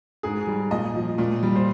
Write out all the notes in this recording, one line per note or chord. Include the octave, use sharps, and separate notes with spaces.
G#2 G#4
G3
A#2 D#5
F3
A#2
G3
C5